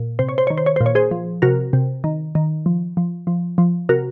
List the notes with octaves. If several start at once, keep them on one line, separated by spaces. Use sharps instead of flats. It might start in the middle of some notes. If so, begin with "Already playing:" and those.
Already playing: A#2
C3 C5
C#5
C5
D#3 C#5
C5
C#5
A#2 C5
C#5
G#4 C5
F3
C3 F#4 A#4
C3
D#3
D#3
F3
F3
F3
F3
C3 F#4 A#4